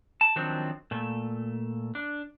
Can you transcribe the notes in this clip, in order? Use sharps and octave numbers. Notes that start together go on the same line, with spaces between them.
A5
D#3 F3 F#3 C4 D4
A#2 A3
D4